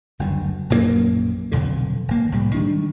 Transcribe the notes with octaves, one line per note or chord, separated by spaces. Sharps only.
F#1 D2 G2
A#1 F#2 D#3 A#3
F1 B1 F2 D3
G#1 A#3
C2 A2 G3
D#3 G3 G#3 D4